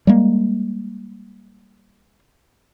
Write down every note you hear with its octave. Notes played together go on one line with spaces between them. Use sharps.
G3 G#3 A#3